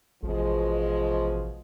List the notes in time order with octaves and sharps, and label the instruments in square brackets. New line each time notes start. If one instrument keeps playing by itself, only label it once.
[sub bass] A1 [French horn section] B2 F3 G#3